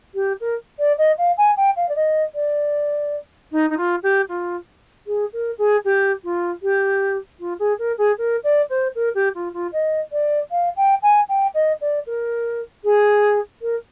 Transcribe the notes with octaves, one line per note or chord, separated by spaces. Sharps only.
G4
A#4
D5
D#5
F5
G#5
G5
F5
D5
D#5
D5
D#4
D#4
F4
G4
F4
G#4
A#4
G#4
G4
F4
G4
F4
G#4
A#4
G#4
A#4
D5
C5
A#4
G4
F4
F4
D#5
D5
F5
G5
G#5
G5
D#5
D5
A#4
G#4
A#4